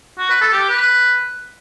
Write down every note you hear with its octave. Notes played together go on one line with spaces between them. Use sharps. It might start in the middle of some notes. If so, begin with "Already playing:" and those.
F#4
B4
A4
G4
B4